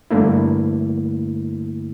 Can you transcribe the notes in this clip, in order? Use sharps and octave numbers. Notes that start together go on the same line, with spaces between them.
G2 D3 A3 A#3 E4